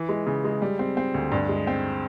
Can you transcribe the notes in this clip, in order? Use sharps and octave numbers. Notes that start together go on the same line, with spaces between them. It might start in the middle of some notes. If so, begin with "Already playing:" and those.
Already playing: E3
G#3
C#3
G#3
G3
C4
C4
D2
G2
G#3
C4